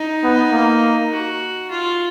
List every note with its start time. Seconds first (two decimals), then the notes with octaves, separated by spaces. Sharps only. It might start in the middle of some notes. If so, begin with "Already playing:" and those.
Already playing: D#4
0.23 B3
0.52 A#3
1.11 F#4
1.71 F4